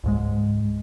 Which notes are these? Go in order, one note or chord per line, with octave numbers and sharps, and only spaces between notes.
C#2 G#2 G#3